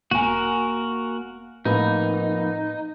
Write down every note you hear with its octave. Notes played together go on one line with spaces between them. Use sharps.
E1 A#3 F#4 A#4 G#5
F2 A2 A#3 D#4 B4